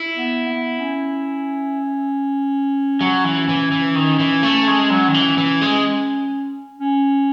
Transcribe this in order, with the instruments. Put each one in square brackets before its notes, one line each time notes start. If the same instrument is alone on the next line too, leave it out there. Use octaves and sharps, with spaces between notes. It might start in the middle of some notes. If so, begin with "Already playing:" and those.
Already playing: [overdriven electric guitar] E4
[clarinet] B3
B3
C#4
[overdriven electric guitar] F#3 [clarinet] C#4
[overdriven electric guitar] E3
E3
E3
D#3
E3
A3
G#3
F#3
D#3
E3
E3
G#3
[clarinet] C#4